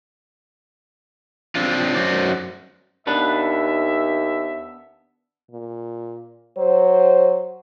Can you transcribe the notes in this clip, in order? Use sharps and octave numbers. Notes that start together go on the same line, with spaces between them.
C4 D4 F4
F#2 F#4 C5 D5
D#2 B3 D4 B4 E5
A#2
F#3 C5